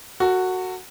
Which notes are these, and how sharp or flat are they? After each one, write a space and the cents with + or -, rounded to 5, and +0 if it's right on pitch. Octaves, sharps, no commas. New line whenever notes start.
F#4 +0 A4 +45